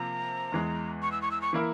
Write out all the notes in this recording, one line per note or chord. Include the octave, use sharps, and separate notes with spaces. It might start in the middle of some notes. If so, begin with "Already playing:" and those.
Already playing: C3 F3 A#3 F4 A#5
E2 E3 G#3
C#6
E6
C#6
E6
C#6
E3 A#3 E4 A#4